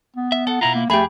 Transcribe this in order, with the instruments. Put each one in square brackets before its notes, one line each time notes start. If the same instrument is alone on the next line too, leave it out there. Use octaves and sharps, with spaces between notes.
[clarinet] B3
[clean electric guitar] E5
[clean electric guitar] A4 [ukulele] F#5
[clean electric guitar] B2 E4 F4 [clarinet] A#5
[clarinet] A#3
[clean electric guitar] F2 G#4 [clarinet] A3 [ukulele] G4 B5